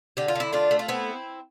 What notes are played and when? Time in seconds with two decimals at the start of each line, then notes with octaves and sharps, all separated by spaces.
0.17 D3 G4
0.28 F4
0.35 D3 E4
0.52 A3 D4 F4
0.71 A3
0.79 F4
0.88 B3 C4 E4